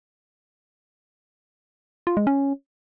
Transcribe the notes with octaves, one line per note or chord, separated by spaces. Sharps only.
F4
G#3
C#4